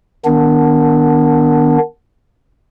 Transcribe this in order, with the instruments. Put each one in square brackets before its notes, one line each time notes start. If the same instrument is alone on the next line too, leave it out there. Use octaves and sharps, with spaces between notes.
[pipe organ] D#3 B3 D4